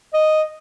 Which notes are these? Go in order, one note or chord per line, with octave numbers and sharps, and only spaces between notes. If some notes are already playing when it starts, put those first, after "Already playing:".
D#5